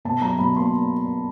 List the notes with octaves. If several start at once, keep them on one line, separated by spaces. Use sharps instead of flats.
B2 A5
F#3 A#5
B2 B5
A#3 C6